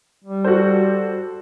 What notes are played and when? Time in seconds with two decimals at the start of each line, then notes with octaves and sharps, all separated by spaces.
0.24 G3
0.44 F#4 A4 C5